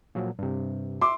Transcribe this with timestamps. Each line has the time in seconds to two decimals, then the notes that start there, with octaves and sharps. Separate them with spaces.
0.15 A#2 F3 F#3
0.39 G2 C3
1.01 E5 C6 D6